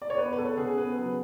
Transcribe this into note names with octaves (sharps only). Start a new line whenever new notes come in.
D5
C#5
B3 B4
B4
B3 A4
C#3 G#4
B3 B4
F#3 B4